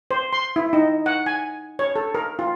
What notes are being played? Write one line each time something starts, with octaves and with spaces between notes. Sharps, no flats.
C5
C6
E4
D#4
F#5
G#5
C#5
A4
A#4
F4